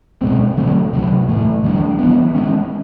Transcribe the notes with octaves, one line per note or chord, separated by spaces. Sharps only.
B2 G#3 C4
D3 F#3 A3 C4
C3 D#3 F#3
A2 E3 A3
D#3 G3 B3 D4
E3 G3 B3
D#3 G#3 C#4